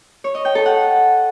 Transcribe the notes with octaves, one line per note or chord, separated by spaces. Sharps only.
C#5
D#5
G5
A4
F#5